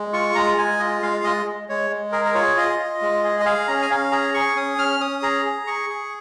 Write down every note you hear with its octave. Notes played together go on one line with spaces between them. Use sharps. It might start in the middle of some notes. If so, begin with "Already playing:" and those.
Already playing: G#3
F4 C#6
G#3 A#5
G#3 G#5
F4 D#5
G#3 F5
G#3 D#5
G#3
G#3 C#5
G#3
G#4 A#4
A#4
F4 C#5
F4 D#5
F4
G#3
G#4
D#5
G#4 F5
C#4 A#5
G#5
C#4 F5
G#4 A#5
G#4 C#6
C#4 D#6
C#4 F6
C#4 D#6
G#4 A#5
G#4
G#4 C#6
G#4